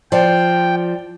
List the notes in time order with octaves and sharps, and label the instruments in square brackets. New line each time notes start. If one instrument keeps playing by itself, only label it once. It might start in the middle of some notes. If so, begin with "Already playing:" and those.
[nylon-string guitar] F3 [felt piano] C5 D5 [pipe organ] G5